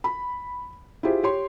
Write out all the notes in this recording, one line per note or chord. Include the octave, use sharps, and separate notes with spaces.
B5
E4 F4 G4 G#4 C5
G4 C#5 C6